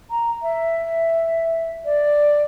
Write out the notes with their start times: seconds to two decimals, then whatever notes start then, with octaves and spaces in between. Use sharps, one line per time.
0.10 A#5
0.42 E5
1.85 D5